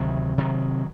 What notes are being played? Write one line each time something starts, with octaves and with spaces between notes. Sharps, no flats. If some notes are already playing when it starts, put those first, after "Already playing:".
Already playing: D2 C3 D#3 F#3
C3 D#3 F#3